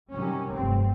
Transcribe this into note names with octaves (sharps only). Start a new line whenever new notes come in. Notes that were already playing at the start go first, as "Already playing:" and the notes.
C3 D#3 F#3 G3 C#4
F1 G2 C4